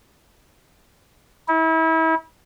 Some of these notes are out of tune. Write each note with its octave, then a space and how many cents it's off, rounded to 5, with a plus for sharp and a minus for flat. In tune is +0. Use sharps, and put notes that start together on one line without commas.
E4 -35